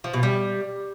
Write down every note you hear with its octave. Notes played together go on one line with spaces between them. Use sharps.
F3
B2
G3